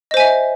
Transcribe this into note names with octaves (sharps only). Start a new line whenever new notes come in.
C5 D#5 E5 G#5